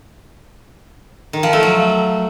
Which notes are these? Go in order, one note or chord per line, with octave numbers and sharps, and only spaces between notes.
D#3
F3
A3
F#3